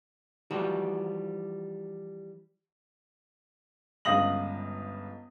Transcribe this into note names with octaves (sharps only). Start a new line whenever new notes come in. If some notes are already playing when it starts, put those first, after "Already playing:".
E3 F3 G3 F#4 G4
G1 C#2 F5 D#6 A#6 F#7